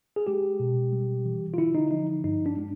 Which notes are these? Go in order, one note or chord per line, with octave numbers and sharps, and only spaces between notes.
G#4
G#3 G4
B2
G3
E3
F4
D3 E4
D#4
F3 D#4
G2 D#4
D4
G#3 D4